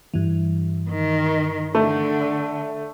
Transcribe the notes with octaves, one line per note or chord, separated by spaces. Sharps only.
G2 E3
D#3
D3 A3